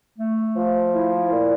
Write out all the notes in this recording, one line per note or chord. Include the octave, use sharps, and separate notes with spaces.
A3
F3
E4
A#2